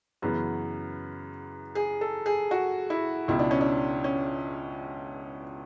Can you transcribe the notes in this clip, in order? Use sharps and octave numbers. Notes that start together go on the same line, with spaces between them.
F#2 C#3 E3 B3
G#4
A4
G#4
F#4
E4
C#2 B2 E4
D4
C#4
D4
C#4